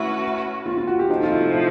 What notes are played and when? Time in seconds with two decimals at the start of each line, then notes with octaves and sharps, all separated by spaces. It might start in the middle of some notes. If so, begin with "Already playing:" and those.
Already playing: A3 C#4 E4 F#4 B4
0.66 F4
0.78 F4
0.87 F#4
0.99 G4
1.09 C3 F3 A3 D#4
1.24 F4
1.31 E4
1.52 E4